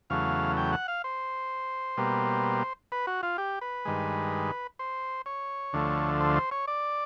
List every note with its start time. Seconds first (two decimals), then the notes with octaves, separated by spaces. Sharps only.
0.10 E2 C#3 F#3 A3 F5
0.57 G5
0.73 F#5
0.88 F5
1.04 C5
1.97 B2 G3 A#3
2.92 B4
3.07 F#4
3.23 F4
3.38 G4
3.61 B4
3.85 G2 D#3 G#3
4.79 C5
5.26 C#5
5.73 D2 D3 F3 A3
6.20 C5
6.36 C5
6.51 C#5
6.67 D5